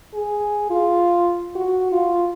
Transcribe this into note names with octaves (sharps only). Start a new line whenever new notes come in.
G#4
F4
F#4
F4